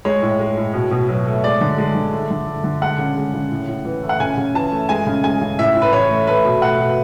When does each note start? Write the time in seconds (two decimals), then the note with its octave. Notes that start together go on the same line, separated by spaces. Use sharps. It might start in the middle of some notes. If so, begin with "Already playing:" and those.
0.05 G#3 C#5
0.22 A2
0.40 G#3
0.57 A2
0.74 B2
0.91 B2
1.09 F#3
1.26 A3
1.44 G#3 D5
1.61 D3
1.78 G#3
1.95 D3
2.12 A3
2.31 D3
2.47 A3
2.64 D3
2.82 G#3 F#5
2.99 C#3
3.17 G#3
3.34 C#3
3.51 A2
3.68 A2
3.85 E3
4.03 A3
4.09 F#5
4.20 C#3 G#5
4.37 C#3
4.54 E3 A5
4.72 A3
4.89 G#3 G#5
5.06 C#3
5.24 G#3 G#5
5.41 C#3
5.59 A2 E5
5.76 A2
5.82 B4
5.93 E3 C#5
6.10 A3
6.27 A3 B4
6.45 B2
6.62 A3 F#5
6.80 B2